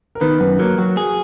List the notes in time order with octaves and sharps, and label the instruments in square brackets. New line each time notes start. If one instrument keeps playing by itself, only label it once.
[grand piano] A#4
[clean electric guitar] D#3 [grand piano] B3 B4
[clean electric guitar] F#2 [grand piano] B3 B4
[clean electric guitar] F#3 [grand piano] A#3 A#4
[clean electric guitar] F#3 [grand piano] F#4
[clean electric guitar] G#4